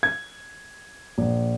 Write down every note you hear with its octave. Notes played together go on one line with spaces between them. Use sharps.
G#6
A#1